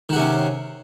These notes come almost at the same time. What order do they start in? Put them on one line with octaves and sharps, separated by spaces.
D#3 F#4 C3 C#4